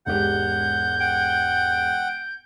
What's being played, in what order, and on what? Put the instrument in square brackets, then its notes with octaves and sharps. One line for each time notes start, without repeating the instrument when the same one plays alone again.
[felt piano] E1 G#2 G4 [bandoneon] F#5 [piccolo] G6
[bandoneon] F#5 G5